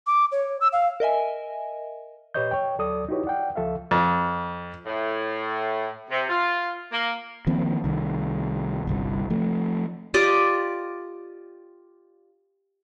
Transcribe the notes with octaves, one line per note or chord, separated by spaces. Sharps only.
D6
C#5
E6
F5
A#4 D#5 E5 G#5
A#2 G4 B4 C#5 D#5 G6
C#5 G5
D2 F#3 A4 D5 D#6
D#4 E4 F#4 G4 B4 C#5
D5 F#5 G5
C#2 F3 A4 E5 F5
F2
A2
C3
F4
A#3
D#3 F3 A#3 C4
C2 D#3
G1 C2 G3
F3 A3
F4 G4 D5 D#5